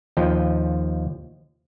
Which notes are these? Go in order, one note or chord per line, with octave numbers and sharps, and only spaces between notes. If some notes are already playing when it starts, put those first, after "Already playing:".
D#2 F3 D#5 G5